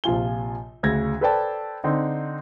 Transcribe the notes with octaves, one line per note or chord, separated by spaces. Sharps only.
A#1 C3 F3 F4 G#5 G7
D2 C#3 G#6 A#6
A4 B4 C5 D5 G5 A5
D3 C4 D#4